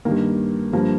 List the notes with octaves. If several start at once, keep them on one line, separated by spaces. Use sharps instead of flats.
G2 D#3 A#3
G2 F3 A#3